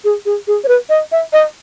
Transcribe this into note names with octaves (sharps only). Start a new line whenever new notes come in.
G#4
G#4
G#4
C#5
B4
D#5
E5
D#5